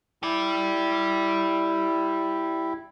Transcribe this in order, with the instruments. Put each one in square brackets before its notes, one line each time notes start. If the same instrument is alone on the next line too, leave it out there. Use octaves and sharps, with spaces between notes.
[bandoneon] E4 [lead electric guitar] G4 D5